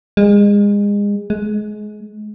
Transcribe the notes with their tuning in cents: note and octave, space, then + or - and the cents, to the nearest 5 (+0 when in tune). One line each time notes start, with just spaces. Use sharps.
G#3 -30
G#3 +25